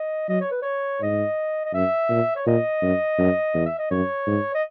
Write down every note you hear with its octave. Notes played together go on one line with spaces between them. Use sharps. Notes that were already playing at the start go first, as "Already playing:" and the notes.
Already playing: D#5
F#3 D#5
C#5
B4
C#5
G#2 D#5
D#5
F#2 E5
A#2
C#5
A#2 D#5
F#2
F#2
E2
E5
D#5
F#2 C#5
G#2
D#5